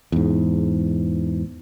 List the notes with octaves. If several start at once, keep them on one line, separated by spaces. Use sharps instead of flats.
E2 G#2